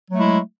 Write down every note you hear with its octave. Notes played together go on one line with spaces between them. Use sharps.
F#3 G#3 A3 E4